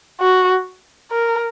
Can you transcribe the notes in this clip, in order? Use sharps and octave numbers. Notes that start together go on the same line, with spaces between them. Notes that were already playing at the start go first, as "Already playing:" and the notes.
F#4
A#4